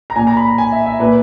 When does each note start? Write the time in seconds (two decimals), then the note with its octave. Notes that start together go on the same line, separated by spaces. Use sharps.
0.10 A#5
0.16 A#2 G#5
0.27 A#5
0.37 B5
0.48 A#5
0.58 G#5
0.72 E5
0.86 E5
0.99 A#2 B4